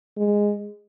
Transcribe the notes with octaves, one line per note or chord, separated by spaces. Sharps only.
G#3